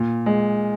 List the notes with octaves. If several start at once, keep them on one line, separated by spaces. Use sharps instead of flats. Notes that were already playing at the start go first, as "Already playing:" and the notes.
Already playing: A#2
G#3